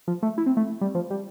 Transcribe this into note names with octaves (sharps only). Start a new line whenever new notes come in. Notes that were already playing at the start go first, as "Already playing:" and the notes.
F3
A3
E4
C4
A3
G3
F3
G3